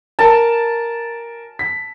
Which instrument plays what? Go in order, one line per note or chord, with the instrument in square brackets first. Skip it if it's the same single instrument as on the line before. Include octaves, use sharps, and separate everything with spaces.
[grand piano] A#4 [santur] A5
[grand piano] B6